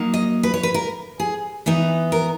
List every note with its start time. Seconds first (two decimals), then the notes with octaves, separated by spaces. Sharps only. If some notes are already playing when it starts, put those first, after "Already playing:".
Already playing: F#3 A#3 D#4
0.14 D#5
0.43 B4
0.54 C#5
0.63 B4
0.74 A#4
1.20 G#4
1.66 E3 B3 D#4
2.12 A#4